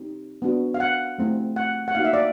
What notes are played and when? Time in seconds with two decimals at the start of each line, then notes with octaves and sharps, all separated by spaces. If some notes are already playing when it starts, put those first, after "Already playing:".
Already playing: C4 D#4 G4
0.42 B3 D4 F#4
0.74 F5
0.80 F#5
1.18 A3 C4 E4
1.56 F#5
1.88 F#5
1.95 A#3 D#4 F#4 F5
2.05 E5
2.14 D5